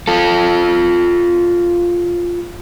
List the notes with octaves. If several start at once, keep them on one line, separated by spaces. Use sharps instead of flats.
F4 A4